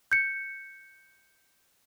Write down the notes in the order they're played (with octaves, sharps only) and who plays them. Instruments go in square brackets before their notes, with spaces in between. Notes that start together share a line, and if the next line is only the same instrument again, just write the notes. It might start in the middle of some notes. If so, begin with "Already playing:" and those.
[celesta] G6 C#7